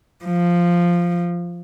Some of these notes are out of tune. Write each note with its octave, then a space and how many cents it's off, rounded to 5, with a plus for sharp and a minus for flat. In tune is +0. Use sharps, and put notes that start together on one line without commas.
F3 -5